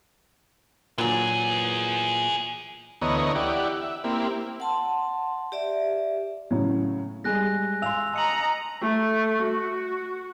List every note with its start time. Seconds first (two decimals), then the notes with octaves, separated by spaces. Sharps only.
0.98 A#2 E3 F#3 G#4
3.02 D2 E3 B3 C#5 D#5 A#5
3.35 E4 G4 D5 F#5
3.81 E5
4.04 A#3 C4 E4 G4
4.60 F#5 A5 C6
5.52 G4 D5 E5
6.51 A2 C#3 F#3
7.24 G3 G#3 G#5 F#6 A#6
7.82 F5 G#5 C6 E6 F7
8.14 D#5 A5 A#5 C#7 F#7
8.81 A3
9.43 F#4